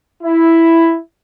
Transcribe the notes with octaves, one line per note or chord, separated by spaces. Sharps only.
E4